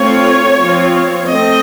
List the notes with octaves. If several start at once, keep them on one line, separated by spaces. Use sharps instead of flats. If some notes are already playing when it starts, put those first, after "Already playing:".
Already playing: A3 C4 F4 C#5
F3 C4 F4
A3 C4 D#5